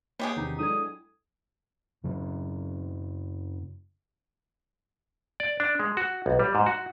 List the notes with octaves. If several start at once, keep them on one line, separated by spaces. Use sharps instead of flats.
B2 A#3 G4 G#4 C#5
E2 C3 D#3 D4 D#4
F#3 G#3 D4 E4 A4 D#6 G#6
F#2 C#3 F#3 C4
D5
D4
G#3
F#4
B1
G3
G#2
F#4